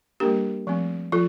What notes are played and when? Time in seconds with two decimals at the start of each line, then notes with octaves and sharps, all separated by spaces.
0.20 G3 A#3 D4 G4 A#4
0.67 F3 A3 C4
1.12 F3 F4 A4